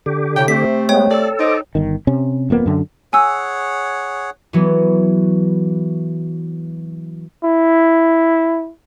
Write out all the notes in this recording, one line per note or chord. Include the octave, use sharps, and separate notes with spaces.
D3 G4
A2 C3 G5
C3 A3 C4 B6
G#3 B3 C#5 G5
A4 D5
D#4 C5 D#5 D6
G1 D#3
C3 C#4
D#1 F2 A#3 B3
F#2 D3
G#4 C#5 F#5 G#5 E6
E3 F#3 B3
E4